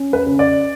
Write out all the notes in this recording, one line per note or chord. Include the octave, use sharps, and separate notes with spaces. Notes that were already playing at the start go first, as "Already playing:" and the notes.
Already playing: C#4
B4
C#3
D5